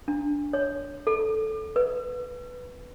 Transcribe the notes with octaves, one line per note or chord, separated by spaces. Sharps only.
D4
C#5
A4
B4